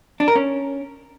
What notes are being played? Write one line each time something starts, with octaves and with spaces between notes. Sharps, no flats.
D4
A#4
C#4